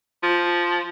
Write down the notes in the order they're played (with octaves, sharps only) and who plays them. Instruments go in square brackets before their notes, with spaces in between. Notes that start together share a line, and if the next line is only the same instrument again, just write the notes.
[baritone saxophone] F3